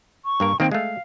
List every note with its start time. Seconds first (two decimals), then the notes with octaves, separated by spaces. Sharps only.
0.25 C#6
0.40 G2 A#3 A#4
0.60 D#3 A#3 C4 G5
0.71 G#3 A3 F5